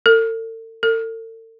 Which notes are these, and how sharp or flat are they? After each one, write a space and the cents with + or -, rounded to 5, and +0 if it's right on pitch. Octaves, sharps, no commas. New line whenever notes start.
A4 +40
A4 +40